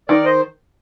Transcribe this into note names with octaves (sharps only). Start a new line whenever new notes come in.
D#3 A#4 D5
C5 D#5